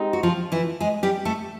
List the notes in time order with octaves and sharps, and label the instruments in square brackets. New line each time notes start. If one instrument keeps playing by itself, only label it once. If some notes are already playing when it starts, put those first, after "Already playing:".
Already playing: [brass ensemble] G#3 C4 D#4 G4
[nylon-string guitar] F#4
F3 F4
E3 E4
G#3 G#4
G3 G4
A3 A4